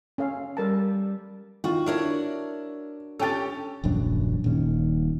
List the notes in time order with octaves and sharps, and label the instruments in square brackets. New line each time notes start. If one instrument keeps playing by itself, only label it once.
[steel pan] C#4 A4 F5
[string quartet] G3 [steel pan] A4 A#4 A5
[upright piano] D#3 F4 [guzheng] F#4
[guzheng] D4 A#4 C#5 [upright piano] E4
[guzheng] C#4 G4 [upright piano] A4 G5 A6
[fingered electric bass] D#1 A#1 F#2 D4
D#1 A#2 D#3 C#4